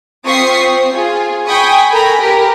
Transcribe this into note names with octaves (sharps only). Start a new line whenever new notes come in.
C4 F4 C#6 D#6 B6 C7
C4
F4 G#4
G5 G#5 B5 C#6 D#6
A4 A#4 G5 G#5 A#5 B5
G4 A#4 B4